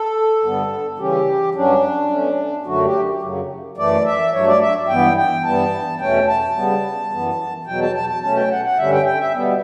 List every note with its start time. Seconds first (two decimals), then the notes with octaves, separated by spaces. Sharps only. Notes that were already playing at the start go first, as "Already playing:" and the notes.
Already playing: A4
0.44 G2 D3 G3 B3
0.98 C#3 E3 G3 C#4 G4
1.55 G2 F#3 C#4 D4
2.10 B2 A3 C#4
2.66 F#2 D3 F#3 A3 F#4
2.84 G4
3.22 F#2 C#3 F#3
3.77 F#2 E3 A3 D5
4.05 E5
4.33 G2 F#3 A3 C#5
4.47 D5
4.61 E5
4.89 G2 E3 B3 G5
5.17 G5
5.45 G2 E3 G3 B3 A5
6.00 E2 B2 A3 C#4 G5
6.28 A5
6.55 C#3 G3 B3
7.11 F#2 E3 B3
7.67 E2 B2 F#3 G5
7.81 A5
7.95 A5
8.09 A5
8.23 B2 A3 C#4 A5
8.36 G5
8.51 F#5
8.65 F#5
8.78 G2 D3 G3 C#4 E5
8.92 G5
9.06 G5
9.20 E5
9.34 B2 G3 B3